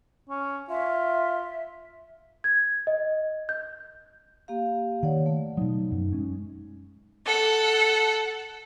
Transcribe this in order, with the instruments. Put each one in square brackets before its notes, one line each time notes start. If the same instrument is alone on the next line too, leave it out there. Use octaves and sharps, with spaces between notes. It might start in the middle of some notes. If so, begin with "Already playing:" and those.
[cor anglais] C#4
[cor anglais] F4 [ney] E5
[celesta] G#6
D#5
G6
[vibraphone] A#3 G4 F5
[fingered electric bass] D#3 [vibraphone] C#5 D5 F#5
[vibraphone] A3
[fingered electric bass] B2 F#3 [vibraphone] D#4
[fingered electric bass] F#2
G#3 A3 C#4
[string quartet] A4 F#5